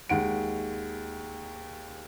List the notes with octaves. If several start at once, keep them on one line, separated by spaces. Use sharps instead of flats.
D#2 G#3 F#5 D7